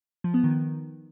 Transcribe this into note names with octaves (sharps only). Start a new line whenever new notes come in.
F3
B3
D#3